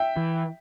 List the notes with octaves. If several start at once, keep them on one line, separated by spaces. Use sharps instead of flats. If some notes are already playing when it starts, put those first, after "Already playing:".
Already playing: E5 G5
E3